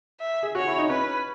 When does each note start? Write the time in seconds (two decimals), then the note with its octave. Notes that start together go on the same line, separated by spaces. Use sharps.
0.20 E5
0.43 G#4
0.55 F#4 C#5
0.67 E4
0.78 D#4
0.90 C#4 B4